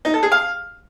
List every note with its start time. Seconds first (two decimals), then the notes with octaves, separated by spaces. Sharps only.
0.05 D#4
0.14 A4
0.23 G#4
0.32 F5